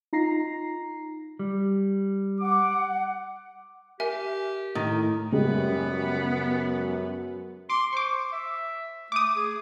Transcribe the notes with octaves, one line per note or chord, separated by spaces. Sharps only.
D#4 F4 A#5 A#6 C7
G3
F#5 D6
G4 A#4 E5 G#5
A2 D#3
F#2 C#3 G3 G#3 B3
C6 D6
C5 C#6 D6
E5
A3 D6 D#6
G#4